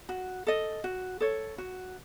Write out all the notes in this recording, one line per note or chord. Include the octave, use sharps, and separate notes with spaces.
F#4
A4 D#5
F#4
A4 C#5
F#4